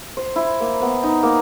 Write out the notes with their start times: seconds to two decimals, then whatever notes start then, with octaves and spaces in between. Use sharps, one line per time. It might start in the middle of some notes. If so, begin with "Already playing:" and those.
0.17 C5
0.36 E4
0.60 A#3
0.82 B3
1.03 D#4
1.23 A#3